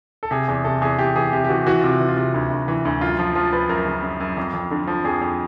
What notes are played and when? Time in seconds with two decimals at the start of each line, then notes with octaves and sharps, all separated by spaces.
0.23 A4
0.31 C3 G#4
0.48 E2 G#4
0.64 C3 A4
0.81 E2 G#4
0.99 E2 G4
1.16 E3 G#4
1.33 C3 G4
1.44 G4
1.49 E3 F#4
1.66 E3 F#4
1.81 C3 F4
2.01 E3
2.08 F4
2.17 C3
2.34 D2
2.51 D2
2.68 E3
2.85 D2
3.01 F#2 F4
3.19 F3 F4
3.35 F3 F4
3.52 F3 B4
3.69 F#2 A#4
3.86 C#3
4.03 F#2
4.20 F#2
4.37 F2
4.53 F2
4.71 D3
4.87 F3
5.04 F2 G#4
5.22 F2